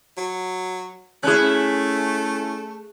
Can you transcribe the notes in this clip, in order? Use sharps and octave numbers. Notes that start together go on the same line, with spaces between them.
F#3
A3 C#4 E4 G#4 F#6